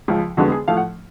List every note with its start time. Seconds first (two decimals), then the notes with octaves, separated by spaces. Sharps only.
0.08 C#2 C#3 F3
0.37 F2 D3 G#3 B3 F#4
0.52 G#4
0.68 A2 F3 A3 F5
0.77 F#5